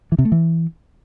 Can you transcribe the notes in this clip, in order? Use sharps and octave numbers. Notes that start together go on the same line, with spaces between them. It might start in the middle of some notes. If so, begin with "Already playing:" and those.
E3
C3
A3
E3